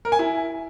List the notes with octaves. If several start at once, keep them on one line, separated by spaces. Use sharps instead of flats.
A#4
G#5
E4